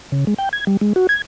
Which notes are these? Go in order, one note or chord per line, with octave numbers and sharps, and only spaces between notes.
C#3
G#3
G5
G#6
G3
G#3
F#4
G#6